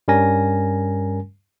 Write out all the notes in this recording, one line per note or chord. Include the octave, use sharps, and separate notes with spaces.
G2 G3 C#4 A#4 G#5 A#6